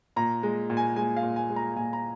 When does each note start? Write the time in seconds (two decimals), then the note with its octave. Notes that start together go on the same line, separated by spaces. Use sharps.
0.16 A#2 A#5
0.43 G#3
0.70 A#2
0.77 G#5
0.96 G#3 G#5
1.17 F5
1.23 A#2
1.36 G#5
1.50 G#3
1.56 A#5
1.76 A#2 G#5
1.93 A#5